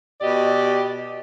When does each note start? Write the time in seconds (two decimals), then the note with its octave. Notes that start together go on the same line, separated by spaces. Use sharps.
0.21 B2 G4 D5 D#5